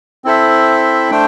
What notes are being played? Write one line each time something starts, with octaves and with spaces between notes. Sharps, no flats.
C4 E4 A4 C5 E5
A3 D4 C5 G5